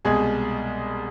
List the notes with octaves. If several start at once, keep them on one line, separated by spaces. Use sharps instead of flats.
C2 B2 G#3 G#4